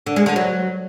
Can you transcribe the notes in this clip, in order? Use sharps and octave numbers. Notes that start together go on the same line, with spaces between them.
D3
G#3
D3
F#3